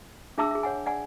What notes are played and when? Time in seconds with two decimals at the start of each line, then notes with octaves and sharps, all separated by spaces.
0.38 D4 G#4 E5 A5 D6 E6
0.51 G#4 E5
0.63 C#5 F#5 G#5
0.86 D5 F#5 G#5